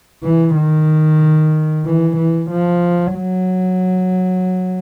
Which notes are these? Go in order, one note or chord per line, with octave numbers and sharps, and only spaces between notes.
E3
D#3
E3
E3
F3
F#3